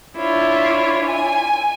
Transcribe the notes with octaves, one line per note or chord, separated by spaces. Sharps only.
D4 E4 F4 C#5
G#5